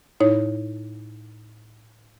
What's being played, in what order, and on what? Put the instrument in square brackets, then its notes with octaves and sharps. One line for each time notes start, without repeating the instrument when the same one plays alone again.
[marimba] A2 D#4 E4 C#5